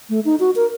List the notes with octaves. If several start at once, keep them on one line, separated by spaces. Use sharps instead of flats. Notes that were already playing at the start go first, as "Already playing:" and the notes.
A3
D#4
F#4
A#4